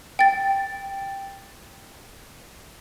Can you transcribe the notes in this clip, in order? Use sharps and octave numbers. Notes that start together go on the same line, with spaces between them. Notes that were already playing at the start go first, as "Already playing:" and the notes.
G5 A6